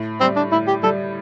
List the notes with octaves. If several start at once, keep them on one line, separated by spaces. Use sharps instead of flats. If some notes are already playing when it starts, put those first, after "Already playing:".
Already playing: A2
G3 C4
D4
A2 E4
G4
G3 A4